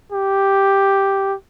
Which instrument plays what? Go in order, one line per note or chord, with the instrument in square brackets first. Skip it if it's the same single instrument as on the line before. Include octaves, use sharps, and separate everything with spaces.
[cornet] G4